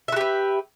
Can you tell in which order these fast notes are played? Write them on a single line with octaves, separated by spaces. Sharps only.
E5 F#4 G4 B4